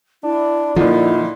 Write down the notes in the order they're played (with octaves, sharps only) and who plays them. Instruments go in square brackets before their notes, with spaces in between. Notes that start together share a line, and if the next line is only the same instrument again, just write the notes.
[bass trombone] D4 [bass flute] E4
[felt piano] A#2 D3 [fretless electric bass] F3 [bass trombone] D#4 [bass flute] E4